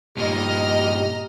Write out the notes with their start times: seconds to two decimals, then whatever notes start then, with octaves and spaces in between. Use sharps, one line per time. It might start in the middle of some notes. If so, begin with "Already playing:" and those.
0.17 G2 A#2 G4 D#5 A#5 F6